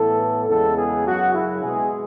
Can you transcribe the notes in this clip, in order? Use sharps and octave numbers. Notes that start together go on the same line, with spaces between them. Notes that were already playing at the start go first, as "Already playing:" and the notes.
Already playing: A2 E3 B3 A4
E2 C#3 G#3 B3 A4
G#4
F#2 C#3 F#3 F#4
E4
B2 G#3 B3 G#4